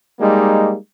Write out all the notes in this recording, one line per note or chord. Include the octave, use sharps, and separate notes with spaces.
G3 G#3 A#3 D#4